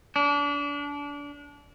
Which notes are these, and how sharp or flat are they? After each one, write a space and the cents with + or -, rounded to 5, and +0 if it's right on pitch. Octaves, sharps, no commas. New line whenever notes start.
D4 -30